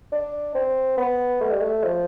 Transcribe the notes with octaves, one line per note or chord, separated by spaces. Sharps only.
D4
C4
B3
A3
G3
A3
F3